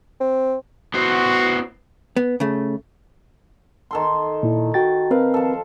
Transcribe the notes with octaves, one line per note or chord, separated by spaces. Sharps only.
C4
B3 E4 F#4 C5
B3
C#3 A3
D#3 A4 C6
A#2 E4
F#4 G5 A6
C4 A#4 B4 F5
F3 A4